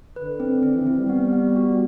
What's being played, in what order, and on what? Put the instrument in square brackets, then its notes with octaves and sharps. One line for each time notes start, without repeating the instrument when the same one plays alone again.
[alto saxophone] D3 [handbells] B4
[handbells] C4
[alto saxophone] D3 [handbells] C4
[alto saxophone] E3
[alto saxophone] E3 [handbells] C4
[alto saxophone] G3
[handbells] B3
B3
F#4